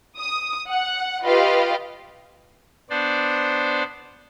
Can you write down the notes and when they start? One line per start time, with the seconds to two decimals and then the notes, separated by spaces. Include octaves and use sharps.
0.18 D#6
0.69 F#5
1.23 F4 G4 B4 D#5 F5
2.90 B3 D4 C5 D5